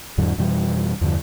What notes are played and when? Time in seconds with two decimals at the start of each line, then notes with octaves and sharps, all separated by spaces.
0.18 E2 G#2 D3 F#3
0.38 F2 B2 E3 G3
1.01 E2 G2 D3 F3